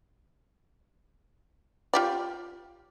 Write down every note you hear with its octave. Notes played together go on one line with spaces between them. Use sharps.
F4 G4 D5